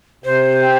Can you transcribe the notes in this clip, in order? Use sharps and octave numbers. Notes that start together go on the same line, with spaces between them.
C3 C5
C4